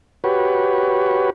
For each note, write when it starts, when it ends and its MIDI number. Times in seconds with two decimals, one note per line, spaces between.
0.24 1.30 66
0.24 1.30 67
0.24 1.30 71
0.24 1.30 73